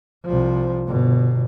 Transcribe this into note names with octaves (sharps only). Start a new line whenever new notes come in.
C2 F3
G1 B2